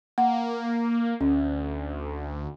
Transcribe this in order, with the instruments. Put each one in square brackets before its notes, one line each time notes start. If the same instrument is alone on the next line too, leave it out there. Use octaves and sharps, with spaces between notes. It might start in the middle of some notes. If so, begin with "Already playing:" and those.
[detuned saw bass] A#3 [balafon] F#5
[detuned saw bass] D2 [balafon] C#4